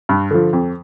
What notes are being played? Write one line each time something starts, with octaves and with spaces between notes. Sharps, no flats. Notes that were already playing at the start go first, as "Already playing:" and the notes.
G2
D3 F3
F2